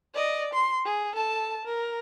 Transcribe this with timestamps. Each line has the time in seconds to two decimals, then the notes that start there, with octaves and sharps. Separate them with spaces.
0.14 D5 D#5
0.54 C6
0.85 G#4
1.15 A4 A5
1.66 A#4